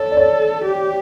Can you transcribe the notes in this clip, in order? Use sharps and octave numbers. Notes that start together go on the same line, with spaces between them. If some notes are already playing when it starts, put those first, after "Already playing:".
Already playing: A4 C#5
D5
C#5
G4